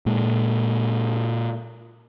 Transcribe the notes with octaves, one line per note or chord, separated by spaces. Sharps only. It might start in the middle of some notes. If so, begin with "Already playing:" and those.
A#2 G#3